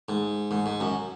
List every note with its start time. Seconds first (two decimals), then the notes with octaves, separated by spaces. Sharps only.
0.09 G#2
0.51 G#2
0.66 G#2
0.80 F#2